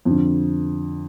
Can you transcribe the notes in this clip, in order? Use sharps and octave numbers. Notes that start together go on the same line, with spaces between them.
F2 D3